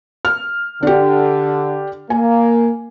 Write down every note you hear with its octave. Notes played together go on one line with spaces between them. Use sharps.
F6
D3 D4 G4
A#3 G#5